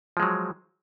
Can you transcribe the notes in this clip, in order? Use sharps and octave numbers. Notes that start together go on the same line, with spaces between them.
F3 F#3 G#3